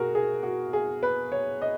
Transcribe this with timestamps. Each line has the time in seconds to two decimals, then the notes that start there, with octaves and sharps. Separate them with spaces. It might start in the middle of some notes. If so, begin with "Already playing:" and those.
Already playing: B2 F#4 G#4 A#4
0.15 G#4
0.43 F#4
0.73 G#4
1.03 B4
1.32 C#5
1.62 D#5